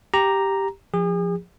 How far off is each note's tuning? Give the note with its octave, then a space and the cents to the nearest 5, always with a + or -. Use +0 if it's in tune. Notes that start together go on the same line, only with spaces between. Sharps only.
G4 +0 A#5 +0
F3 +0 G#4 -40